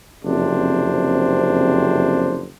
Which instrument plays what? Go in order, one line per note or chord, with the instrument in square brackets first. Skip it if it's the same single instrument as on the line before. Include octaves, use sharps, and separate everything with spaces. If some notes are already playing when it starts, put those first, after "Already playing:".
[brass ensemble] F#1 F2 C3 D4 C5